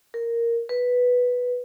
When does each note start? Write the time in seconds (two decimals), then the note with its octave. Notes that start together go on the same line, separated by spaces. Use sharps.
0.14 A#4
0.69 B4